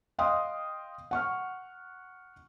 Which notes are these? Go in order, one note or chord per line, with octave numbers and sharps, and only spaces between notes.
D#5 F5 G5 C6 D#6
F#5 C#6 F6